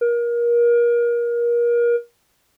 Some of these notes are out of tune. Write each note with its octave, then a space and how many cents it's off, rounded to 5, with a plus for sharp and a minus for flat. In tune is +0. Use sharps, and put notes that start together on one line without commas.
A#4 +30